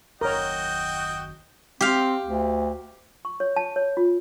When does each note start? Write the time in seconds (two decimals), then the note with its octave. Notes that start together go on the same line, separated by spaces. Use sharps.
0.21 F#1 D#2 F#4 A#4 C#5 D#5 G5
1.81 C4 G4 F5
2.22 D2
3.25 C#6
3.40 C#5
3.56 A5
3.76 C#5
3.97 F4